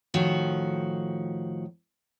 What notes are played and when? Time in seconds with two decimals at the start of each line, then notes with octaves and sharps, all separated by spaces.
0.14 A2 D#3 F3 F#4